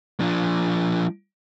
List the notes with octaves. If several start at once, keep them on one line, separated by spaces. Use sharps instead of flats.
F3 D4